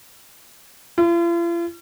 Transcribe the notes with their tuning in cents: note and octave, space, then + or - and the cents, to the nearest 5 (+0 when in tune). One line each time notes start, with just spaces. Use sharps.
F4 -45